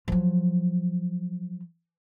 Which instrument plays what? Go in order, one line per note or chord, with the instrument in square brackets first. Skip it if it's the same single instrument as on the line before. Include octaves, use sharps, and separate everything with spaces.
[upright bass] F3 F#3